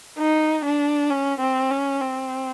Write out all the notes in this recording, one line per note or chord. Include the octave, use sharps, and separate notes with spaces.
D#4
D4
C#4
C4
C#4
C4